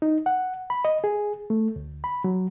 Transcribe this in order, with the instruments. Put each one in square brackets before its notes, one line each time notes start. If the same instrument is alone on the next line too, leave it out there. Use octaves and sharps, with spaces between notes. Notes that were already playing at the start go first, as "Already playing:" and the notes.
[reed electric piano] D#4
F#5
B5
D#5
G#4
A3
D2
B5
F#3